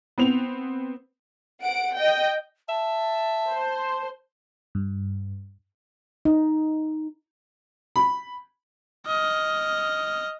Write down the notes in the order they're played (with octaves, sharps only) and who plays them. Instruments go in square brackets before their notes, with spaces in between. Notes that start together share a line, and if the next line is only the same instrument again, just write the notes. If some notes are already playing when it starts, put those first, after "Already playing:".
[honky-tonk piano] B3 C4 F7
[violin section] F#5 D7
D#5 G5
[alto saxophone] E5 [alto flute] A5
[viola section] C5
[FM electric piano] G2
[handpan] D#4
[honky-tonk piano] B5
[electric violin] D#5 F6